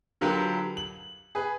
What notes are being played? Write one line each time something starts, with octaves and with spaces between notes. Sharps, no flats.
D3 F#3 F4 G4 A#4 B4
F#7
G#4 B4